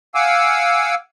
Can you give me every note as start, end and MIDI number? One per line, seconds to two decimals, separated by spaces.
0.15 0.95 77
0.15 0.95 78
0.15 0.95 80
0.15 0.95 86
0.15 0.95 88